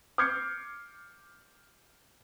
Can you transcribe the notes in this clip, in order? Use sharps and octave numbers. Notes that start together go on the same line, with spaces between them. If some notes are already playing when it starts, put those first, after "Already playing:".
D6 F6 G6 G#6 C7 C#7